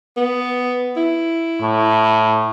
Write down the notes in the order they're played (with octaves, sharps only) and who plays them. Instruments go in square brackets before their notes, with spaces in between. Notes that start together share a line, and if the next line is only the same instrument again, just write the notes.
[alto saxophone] B3
E4
[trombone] A2